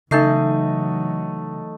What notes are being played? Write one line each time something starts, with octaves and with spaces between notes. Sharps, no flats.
C#3 E3 F#3 A3 D#4 D#5 G6 C7